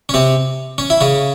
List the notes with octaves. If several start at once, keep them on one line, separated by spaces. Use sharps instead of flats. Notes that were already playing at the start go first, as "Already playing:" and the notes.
C#4
C3 C4
C#4
E4
C#3 C#4